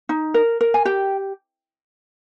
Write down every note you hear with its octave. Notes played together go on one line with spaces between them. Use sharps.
D#4
A#4
A#4
G#5
G4 G5